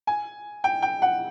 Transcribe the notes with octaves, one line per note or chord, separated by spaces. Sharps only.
G#5
G5
G5
F#5